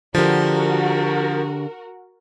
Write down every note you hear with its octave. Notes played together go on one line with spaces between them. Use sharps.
D3 F3 F#4 G4 A#4